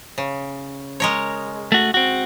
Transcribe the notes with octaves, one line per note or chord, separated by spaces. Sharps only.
C#3
G#3 A#4 C#5
A3 F#4
C4 F#4